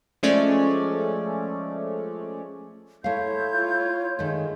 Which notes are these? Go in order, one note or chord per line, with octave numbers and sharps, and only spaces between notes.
F3 G#3 A3 C#4 C#5 D5
A3 E4 C#5 F5 C6 G6
F4
D#3 G#3 A3